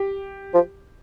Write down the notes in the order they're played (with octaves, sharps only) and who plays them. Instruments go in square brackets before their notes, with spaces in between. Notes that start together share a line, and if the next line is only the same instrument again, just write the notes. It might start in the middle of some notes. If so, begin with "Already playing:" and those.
Already playing: [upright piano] G4
[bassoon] F3